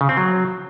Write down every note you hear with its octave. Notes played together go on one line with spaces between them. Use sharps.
C#3
C4
F#3